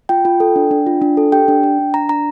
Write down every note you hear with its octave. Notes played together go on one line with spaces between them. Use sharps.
F4 G5
F4
A4
D4
D4
F4
D4
A4
G4 G5
D4
D4
D4
D4 A#5
D4 A#5